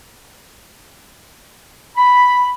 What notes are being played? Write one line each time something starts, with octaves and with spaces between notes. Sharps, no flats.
B5